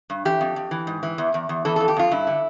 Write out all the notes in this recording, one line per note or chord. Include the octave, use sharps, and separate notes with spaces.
G2
E3 G4
F2
F2
E3
G#2
E3
E2
E2
E2
E3 A4
F2 A4
G4
F2 F4
G2 E4
D3